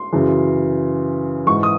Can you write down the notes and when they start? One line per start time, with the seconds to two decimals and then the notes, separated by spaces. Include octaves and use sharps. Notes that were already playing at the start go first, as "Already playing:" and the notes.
Already playing: C6
0.13 F#2 C#3 E3
1.47 G#2 E3 C#6
1.63 D#6